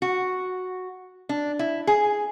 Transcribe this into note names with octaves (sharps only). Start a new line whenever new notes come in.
F#4
D4
E4
G#4